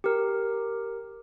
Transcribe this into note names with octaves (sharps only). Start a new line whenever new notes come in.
G4 A#4